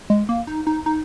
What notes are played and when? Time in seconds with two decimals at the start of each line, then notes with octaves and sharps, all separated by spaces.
0.10 G#3
0.29 A#3
0.47 D#4
0.67 D#4
0.86 D#4